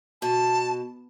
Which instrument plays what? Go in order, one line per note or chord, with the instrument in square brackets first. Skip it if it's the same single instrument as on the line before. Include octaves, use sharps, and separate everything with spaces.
[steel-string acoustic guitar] B2 [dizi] A5